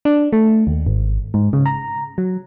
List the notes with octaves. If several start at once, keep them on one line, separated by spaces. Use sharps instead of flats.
D4
A3
D#2
G#1
G#2
C#3
A#5
F#3